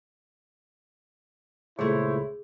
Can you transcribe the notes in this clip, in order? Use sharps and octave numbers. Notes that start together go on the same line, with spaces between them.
C#2 A#2 A3 E4 G#4 C5 C#5